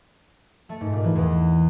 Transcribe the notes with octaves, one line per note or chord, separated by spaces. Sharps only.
A3
G#2
A#2
E3
E2